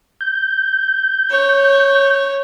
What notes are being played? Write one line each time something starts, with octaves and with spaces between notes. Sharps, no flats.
G6
C#5